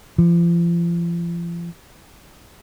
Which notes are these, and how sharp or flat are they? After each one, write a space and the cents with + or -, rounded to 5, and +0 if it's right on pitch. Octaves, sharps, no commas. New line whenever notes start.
F3 -40